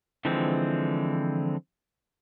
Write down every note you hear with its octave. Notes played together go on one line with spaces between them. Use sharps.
D3 E3 F3 G#3 C4